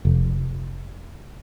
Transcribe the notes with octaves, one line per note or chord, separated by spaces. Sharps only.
F1